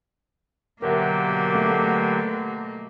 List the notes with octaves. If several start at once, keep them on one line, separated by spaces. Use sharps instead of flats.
B2 D3 F#3 A#3 G4 A#4 E5
A3